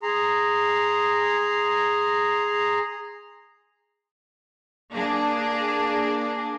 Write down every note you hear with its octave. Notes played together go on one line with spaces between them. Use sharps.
G#4 A#5 C6
A#3 D4 G#4